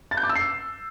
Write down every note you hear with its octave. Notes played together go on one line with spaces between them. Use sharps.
A6
G6
D6
E6
C7